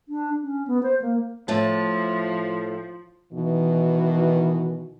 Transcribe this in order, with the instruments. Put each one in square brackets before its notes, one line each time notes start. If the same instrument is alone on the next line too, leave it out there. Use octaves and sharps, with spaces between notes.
[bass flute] D4
C#4
B3
C5
A#3
[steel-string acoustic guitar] A2 A5 [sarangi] F3
[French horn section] B2 D#3 E3